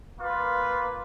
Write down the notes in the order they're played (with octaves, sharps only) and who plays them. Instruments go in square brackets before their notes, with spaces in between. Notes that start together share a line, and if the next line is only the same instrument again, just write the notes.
[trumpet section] A#3 F4 F5 [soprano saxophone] B4